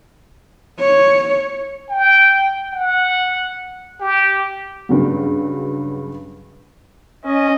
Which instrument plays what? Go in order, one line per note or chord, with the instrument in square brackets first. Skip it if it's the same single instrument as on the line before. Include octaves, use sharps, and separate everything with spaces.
[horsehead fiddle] C#5
[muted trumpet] G5
F#5
G4
[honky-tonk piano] G2 C#3 F#3
[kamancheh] C#4 [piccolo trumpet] D#5